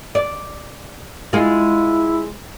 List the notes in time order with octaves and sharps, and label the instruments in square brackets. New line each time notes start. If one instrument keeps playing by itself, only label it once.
[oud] D5
[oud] G#3 F4 [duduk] E4